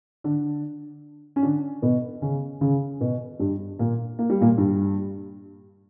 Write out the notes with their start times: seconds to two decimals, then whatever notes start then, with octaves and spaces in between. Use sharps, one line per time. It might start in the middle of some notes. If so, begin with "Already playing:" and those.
0.24 D3 D4
1.36 C#4
1.43 D3 D4
1.82 B2 B3
2.22 C#3 C#4
2.61 C#3 C#4
3.01 B2 B3
3.39 G2 G3
3.79 A#2 A#3
4.19 A#3
4.30 G3
4.41 A#2 A#3
4.57 G2 G3